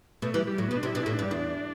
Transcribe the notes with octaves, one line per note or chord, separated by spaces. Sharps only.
B2 A3
E3 G3
G3
A2 F#3
B2 B3
D4
C3 E4
B2 D4
A2 E4
D4
G2
G3
E2 D4